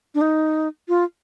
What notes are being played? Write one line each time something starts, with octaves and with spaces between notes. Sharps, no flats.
D4
D#4
F4